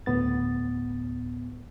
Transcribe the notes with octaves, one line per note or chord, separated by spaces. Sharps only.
D2 A2 B3 A6